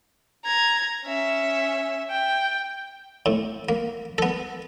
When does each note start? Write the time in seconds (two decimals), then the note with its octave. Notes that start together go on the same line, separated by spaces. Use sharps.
0.45 A#5 G#6
1.05 C#4 E5
2.11 G5
3.26 A2
3.69 A#3
4.18 B3 A4